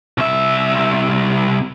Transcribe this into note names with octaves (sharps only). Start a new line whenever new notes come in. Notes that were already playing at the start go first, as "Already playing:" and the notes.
C2 E5